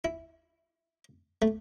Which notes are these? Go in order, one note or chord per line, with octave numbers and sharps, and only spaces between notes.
E4
A3